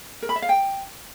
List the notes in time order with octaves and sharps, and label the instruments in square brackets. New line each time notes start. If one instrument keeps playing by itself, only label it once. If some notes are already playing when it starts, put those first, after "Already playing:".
[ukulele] A#4
B5
E5
F5
G5